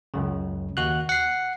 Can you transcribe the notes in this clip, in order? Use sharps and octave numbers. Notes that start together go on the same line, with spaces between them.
C#2 F#2 C#3
D#2 F#4 F#6
F#5 C7